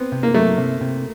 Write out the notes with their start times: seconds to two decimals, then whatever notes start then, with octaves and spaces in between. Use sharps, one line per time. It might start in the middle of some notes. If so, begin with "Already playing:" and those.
Already playing: B3 C4
0.12 C3
0.23 A#3
0.34 F#3 A3
0.58 C3
0.81 C3